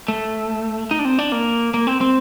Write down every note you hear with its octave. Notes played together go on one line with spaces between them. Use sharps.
A3
D#4
D4
C4
D4
A#3
A#3
C4
C4